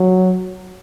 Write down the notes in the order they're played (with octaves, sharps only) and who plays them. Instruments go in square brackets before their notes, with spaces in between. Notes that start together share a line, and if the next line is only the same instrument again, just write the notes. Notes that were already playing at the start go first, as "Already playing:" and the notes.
Already playing: [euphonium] F#3